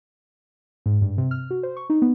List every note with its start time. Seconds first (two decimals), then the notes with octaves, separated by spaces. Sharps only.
0.86 G#2
1.02 G2
1.18 C3
1.31 F6
1.50 F#4
1.63 C5
1.77 C#6
1.90 D#4
2.02 B3